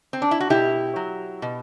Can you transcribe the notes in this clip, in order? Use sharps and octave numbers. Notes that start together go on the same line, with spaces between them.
C4
D4
E4
F#4
B2 E4 G4
F#3
B2